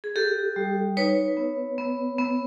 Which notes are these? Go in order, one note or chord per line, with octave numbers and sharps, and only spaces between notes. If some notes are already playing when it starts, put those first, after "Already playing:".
G#4
F#4 G4 A4
G3
D#4 B4 C#5
B3
B3
B3